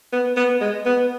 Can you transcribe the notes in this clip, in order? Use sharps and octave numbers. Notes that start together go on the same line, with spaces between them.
B3
B3
G#3
B3